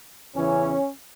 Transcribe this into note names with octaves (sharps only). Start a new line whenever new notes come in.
E2 C#3 E3 C#4